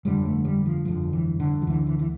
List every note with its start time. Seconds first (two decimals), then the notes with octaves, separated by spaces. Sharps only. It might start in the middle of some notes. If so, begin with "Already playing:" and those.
0.05 G1 F2 D3 G3
0.26 A3
0.45 G3
0.66 F3
0.85 G1 F2 D3 F3
1.13 E3
1.40 D3
1.62 F3
1.67 D2 D3 E3
1.87 E3
1.99 E3